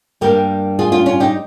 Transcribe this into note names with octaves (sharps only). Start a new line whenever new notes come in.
G2 G3 A#3 G4 A#4
F4 G#4
C#4 F4
C#4 F4
D#4 G4